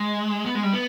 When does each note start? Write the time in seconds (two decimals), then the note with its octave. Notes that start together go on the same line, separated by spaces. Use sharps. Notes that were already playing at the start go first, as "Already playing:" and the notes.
Already playing: G#3
0.46 B3
0.55 G#3
0.63 G3
0.72 B3